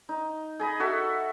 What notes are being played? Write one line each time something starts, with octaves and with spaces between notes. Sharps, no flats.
D#4
G#4 D#5 B5
F#4 A4 E5